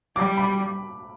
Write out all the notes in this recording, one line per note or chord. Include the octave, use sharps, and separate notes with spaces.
G3 D6
B5